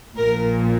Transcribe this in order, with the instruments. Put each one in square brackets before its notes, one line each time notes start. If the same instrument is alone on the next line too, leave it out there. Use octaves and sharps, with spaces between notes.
[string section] A#1 A#2 F3 A#4